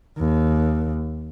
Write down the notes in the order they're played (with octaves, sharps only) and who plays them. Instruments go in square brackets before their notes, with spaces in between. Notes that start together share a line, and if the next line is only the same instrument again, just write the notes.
[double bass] D#2